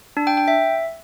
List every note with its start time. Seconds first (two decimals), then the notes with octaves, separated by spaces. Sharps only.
0.17 D4
0.27 G5
0.37 G5
0.48 E5